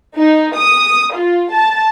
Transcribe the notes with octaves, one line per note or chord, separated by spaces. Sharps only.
D#4
D#6
F4
A5